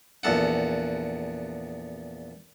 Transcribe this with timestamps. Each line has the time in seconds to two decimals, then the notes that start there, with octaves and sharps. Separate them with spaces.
0.23 A#1 E2 A4 F#5